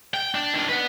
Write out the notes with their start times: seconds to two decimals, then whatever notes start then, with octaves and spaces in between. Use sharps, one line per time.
0.14 G5
0.35 D4
0.54 D#3 D4
0.68 B4 F#5